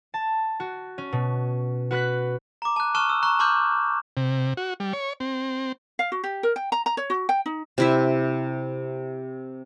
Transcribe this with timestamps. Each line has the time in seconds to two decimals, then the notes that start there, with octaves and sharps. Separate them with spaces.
0.14 A5
0.60 F#4
0.98 C#4
1.12 B2
1.91 F#4 B4 F#6 B6
2.62 A#5 D6
2.76 A5 F#6
2.95 A5 C#6 D#6 F6 F#6 E7
3.09 E6
3.23 A#5 C#6 F#6
3.39 A5 A#5 C6 D6 F6 G6
4.17 C3
4.57 F#4
4.80 G3
4.93 C#5
5.20 C4
5.99 F5
6.12 F#4
6.24 G4
6.43 A#4
6.56 G5
6.72 A#5
6.86 A#5
6.97 C#5
7.10 F#4
7.29 G5
7.46 D#4
7.78 C3 E4 E5